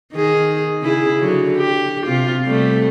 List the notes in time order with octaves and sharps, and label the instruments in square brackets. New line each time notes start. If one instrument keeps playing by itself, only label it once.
[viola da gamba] D#3 G#4
C#3 E4 G#4
D3 F#3
G4
C3 F4
C3 G3 A3